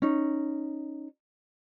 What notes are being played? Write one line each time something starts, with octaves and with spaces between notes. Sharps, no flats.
C#4 D#4